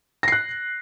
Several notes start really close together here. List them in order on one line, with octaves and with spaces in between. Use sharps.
A#6 C7 F#6